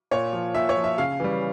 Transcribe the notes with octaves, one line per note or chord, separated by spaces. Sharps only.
A#2 C#5
F3
A#2 E5
C#5
F3
E5
C#3 F5
E3 G3